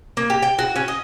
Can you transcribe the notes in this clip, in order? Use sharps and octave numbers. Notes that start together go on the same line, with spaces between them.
A#3
G4
G5
F#4
C#4
D#5